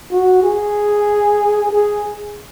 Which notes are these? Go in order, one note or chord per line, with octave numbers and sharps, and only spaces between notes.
F#4
G#4
G#4